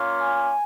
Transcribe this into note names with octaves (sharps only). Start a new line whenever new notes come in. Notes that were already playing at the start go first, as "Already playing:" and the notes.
Already playing: A#3 C#4 F4
G#5